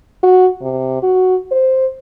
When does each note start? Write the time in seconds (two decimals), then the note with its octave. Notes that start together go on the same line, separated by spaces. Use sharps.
0.23 F#4
0.62 C3
1.02 F#4
1.51 C5